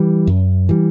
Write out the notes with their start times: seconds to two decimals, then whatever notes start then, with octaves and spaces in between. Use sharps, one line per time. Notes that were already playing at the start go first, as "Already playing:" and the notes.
Already playing: E3 G3
0.27 F#2
0.69 E3 G3